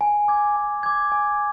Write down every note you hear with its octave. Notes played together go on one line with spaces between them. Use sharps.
G#5
D6 G#6
G#5
D6 G#6
G#5